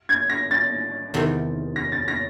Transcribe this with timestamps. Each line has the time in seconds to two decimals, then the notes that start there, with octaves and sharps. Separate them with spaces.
0.09 G#6
0.30 A#6
0.51 A6
1.14 E2 C3 D#3
1.76 A#6
1.92 A6
2.08 A#6